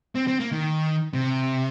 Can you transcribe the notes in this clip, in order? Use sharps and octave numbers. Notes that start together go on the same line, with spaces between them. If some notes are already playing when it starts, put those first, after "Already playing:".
C4
C4
A#3
D#3
C3